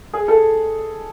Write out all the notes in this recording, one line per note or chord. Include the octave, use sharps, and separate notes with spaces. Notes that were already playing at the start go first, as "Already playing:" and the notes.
G#4
A4